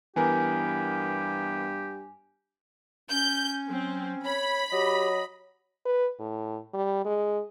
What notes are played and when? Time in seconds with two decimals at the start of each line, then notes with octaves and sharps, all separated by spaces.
0.16 G2 E3 B3 G4 A#4 G#5
3.10 C#4 G6
3.69 F#3 C4
4.24 C#5 B5
4.72 F#3 G4 D#5
5.86 B4
6.19 A2
6.74 G3
7.05 G#3